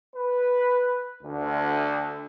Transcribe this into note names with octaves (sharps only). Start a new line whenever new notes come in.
B4
D2